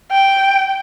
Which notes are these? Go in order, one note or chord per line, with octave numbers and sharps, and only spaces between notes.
G5